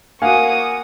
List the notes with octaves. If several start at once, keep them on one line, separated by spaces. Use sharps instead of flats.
A#3 F#4 F5 F#5 G#5 C#6 D#6